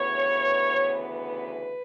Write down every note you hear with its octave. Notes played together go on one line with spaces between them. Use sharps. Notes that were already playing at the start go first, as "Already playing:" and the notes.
Already playing: D2 C#3 E3 B3 C#5
B4